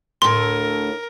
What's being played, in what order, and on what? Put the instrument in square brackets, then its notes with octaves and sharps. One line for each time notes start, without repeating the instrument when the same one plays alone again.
[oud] D2 A2 [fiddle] A#4 [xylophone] C6